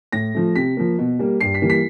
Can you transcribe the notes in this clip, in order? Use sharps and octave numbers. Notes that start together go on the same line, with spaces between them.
A2 A#6
F3 A3
C3 B6
F3 A#3
B2
G3 A#3
G2 C7
B6
E3 G3 A#3
B6